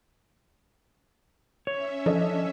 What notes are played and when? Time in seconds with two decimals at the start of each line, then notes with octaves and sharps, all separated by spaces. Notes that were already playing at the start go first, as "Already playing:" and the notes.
1.67 C#4 C#5 E5
2.06 F3 D4 A4 D#5